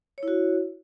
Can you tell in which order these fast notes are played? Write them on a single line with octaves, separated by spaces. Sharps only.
C#5 E4 F#4